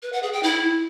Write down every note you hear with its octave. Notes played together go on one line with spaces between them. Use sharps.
B4
F#5
G#4
G5
E4